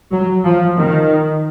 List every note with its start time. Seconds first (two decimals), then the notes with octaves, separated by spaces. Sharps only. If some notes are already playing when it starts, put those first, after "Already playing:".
0.11 F#3
0.44 F3
0.77 D#3